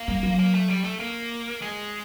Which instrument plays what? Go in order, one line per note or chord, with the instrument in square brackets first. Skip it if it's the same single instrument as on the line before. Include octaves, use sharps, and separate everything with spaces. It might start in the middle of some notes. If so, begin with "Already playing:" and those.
Already playing: [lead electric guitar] A#3
[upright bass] G3
F#3
[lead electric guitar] A#3
A3
G3
A3
A#3
G#3